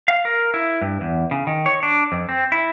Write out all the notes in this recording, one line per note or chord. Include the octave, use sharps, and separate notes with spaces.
F5
A#4
E4
G2
E2
C#3
D#3
C#5
D4
F2
C4
E4